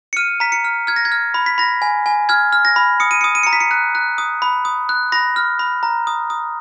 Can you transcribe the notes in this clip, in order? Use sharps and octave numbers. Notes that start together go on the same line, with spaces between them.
C#7
F6 D#7
A#5 B6
C#7
F6
F6 G#6
A#6
G#6
F6
B5
B6
B5 A#6
G#5
G#5
F6 G#6
F6
A#6
B5
D#6 C#7
D#7
D#6 C#7
D#7
A#5 C#7
B6
C#7
F#6
F#6
D#6
B5
D#6
F#6
B5 A#6
F6
B5
A#5
D#6
D#6